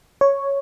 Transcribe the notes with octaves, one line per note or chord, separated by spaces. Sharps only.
C#5